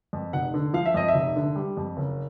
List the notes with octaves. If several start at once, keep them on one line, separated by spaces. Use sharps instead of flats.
F2
F1 F#5
D3
F3 F5
E5
F2 D#5
E5
F1
D3
G3
F2
F#1